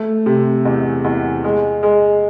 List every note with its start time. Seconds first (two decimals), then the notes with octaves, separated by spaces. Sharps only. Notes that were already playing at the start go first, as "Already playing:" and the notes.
Already playing: A3
0.26 C3
0.65 E2
1.04 E2
1.44 G#3
1.83 G#3